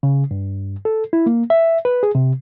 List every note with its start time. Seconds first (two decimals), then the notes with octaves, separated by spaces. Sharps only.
0.03 C#3
0.31 G2
0.85 A4
1.13 E4
1.26 A#3
1.50 E5
1.85 B4
2.03 G#4
2.15 C3